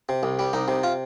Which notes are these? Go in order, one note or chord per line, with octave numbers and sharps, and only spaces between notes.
C3
C2
G3
C2 D#4
C3
F4